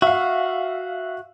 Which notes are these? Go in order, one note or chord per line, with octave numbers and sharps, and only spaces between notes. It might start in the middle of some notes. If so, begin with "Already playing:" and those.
F#4 E5 F5